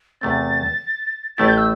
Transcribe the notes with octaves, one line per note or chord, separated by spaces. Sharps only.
E2 C3 A3 C4 A6
A1 A2 A3 E4 A6
G6
E6